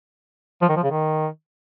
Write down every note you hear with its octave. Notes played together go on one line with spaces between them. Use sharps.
F3
D#3
F3
C#3
D#3